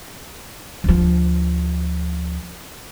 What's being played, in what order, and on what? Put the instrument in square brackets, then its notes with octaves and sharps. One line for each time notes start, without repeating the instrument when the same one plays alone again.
[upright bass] D2 F3